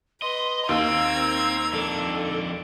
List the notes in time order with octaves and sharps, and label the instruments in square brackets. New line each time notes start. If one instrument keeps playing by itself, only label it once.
[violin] B4 [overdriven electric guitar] D#5 [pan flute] C6
[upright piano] D#2 [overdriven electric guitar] C4 [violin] A#5 G#6 [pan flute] E6
[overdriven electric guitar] F2 D4 [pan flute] A4